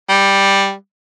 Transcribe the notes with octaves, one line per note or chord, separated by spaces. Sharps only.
G3